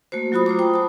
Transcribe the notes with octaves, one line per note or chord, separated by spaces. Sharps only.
A3 A#3 F#4 C5
F#3 F4 F#4 B5 D#6
F4 C5 A#5 D6
F4 C5 G5 D#6
A5 B5